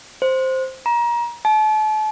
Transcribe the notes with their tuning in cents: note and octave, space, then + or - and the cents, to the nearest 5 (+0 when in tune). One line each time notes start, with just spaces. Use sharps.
C5 +0
A#5 +30
A5 -40